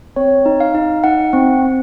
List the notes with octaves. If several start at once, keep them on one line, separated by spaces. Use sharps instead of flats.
C4 C#5
D#4
F5
D#4
D#4 F#5
C4
C4